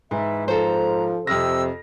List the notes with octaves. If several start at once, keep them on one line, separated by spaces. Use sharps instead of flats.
G#2 E3 E5
F3 A4 C5 A#5
F2 C3 E6 F6 A#6